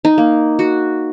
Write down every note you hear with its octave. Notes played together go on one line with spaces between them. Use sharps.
D#4
A#3
F#4